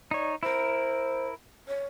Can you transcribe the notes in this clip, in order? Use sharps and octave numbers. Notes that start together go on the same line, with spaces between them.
D#4 C#5 D5
E4 A#4 C5
C#5